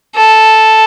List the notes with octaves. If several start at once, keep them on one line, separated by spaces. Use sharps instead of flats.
A4